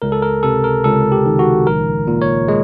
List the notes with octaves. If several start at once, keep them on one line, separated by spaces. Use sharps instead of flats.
C#2 A#4
A4
A#4
C3 A4
A#4
C#2 A4
G4
D#3
F#4
A#1 A#4
A#2
C#5
G#3